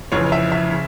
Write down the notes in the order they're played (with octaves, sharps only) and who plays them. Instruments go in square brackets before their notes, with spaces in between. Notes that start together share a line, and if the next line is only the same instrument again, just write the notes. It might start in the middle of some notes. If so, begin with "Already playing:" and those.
[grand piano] F1 F2 C#3 E3 C#5
E5
E5
C#3